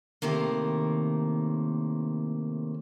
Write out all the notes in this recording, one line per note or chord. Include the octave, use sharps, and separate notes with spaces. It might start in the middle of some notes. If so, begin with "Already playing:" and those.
A2 C3 D#3 A#3